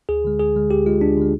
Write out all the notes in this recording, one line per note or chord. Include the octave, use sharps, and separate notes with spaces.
D2 G#4
D3 G#3
D2 G#4
D3 G#3
D2 G4
D3 G#3 F4
D2 D4
D3 G#3